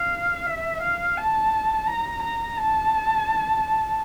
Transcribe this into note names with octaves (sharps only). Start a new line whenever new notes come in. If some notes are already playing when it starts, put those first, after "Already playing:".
Already playing: F5
E5
F5
A5
A#5
A#5
A5